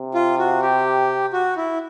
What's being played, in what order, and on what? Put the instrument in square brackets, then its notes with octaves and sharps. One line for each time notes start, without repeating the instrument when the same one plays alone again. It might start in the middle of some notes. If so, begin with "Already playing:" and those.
Already playing: [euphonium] C3
[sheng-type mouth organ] F4
F#4
G4
F#4
E4